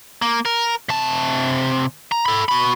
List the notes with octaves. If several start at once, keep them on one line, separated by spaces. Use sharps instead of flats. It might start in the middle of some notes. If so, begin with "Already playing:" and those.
A#3
A#4
C3 A5
A#5
A4 B5
F#4 B5